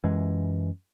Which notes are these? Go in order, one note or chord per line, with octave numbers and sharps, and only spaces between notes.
F#2 E3 G#3